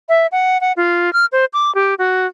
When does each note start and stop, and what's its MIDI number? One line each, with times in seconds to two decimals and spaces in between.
0.09 0.27 76
0.32 0.60 78
0.61 0.72 78
0.77 1.13 65
1.13 1.26 89
1.32 1.45 72
1.53 1.73 86
1.75 1.95 67
1.99 2.27 66